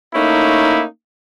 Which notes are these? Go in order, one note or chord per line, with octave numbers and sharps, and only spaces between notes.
A3 A#3 C#4 D#4 E4